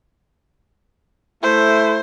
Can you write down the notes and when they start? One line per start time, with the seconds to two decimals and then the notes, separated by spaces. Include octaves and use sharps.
1.43 A3 E4 C5